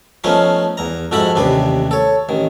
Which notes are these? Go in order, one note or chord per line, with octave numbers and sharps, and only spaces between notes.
F3 A3 B3 C#4 D#4 F4
E2 A#5
F2 G#2 F#4 A4 E5 B5
A1 D#2 C3 D4 B4
A4 C#5
A1 D#3